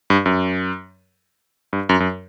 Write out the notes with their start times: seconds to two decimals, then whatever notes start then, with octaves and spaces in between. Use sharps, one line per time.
0.10 G2
0.26 F#2
1.73 G2
1.89 F#2
2.00 F#2